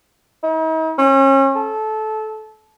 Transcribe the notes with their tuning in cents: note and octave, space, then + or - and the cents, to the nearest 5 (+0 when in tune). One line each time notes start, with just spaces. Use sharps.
D#4 +45
C#4 -35
A4 -20